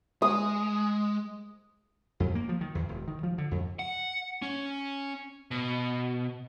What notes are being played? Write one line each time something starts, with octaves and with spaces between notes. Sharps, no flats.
G#3 D#6
F2
A#3
F3
D#3
E2
E1
D#3
F3
D3
F2
F#5
C#4
B2